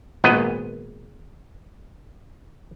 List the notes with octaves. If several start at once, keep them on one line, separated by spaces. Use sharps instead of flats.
G#1 A#2 B3 D#5